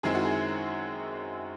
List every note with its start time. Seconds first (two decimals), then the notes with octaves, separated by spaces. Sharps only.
0.03 F#2 D#3 G#3 C4 E4 G#4
0.15 F#4
0.25 G#4